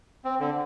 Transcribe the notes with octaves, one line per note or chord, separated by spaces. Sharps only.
C4
D3